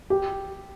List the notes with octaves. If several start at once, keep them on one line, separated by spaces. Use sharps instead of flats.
G4